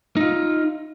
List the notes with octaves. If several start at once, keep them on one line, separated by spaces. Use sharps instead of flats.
D#4 F4